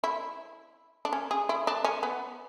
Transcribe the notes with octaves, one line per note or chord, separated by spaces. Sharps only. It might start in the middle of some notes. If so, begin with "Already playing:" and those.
E4
D4
C#4
G#4
E4
D4
C#4
B3